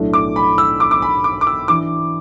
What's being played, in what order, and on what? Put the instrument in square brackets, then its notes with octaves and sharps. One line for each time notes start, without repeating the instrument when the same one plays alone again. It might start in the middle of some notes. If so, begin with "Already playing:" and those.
Already playing: [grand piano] B1 A2 A3 D4
D6
B5
E6
D6
D6
B5
D6
D6
E6
E3 D4 D6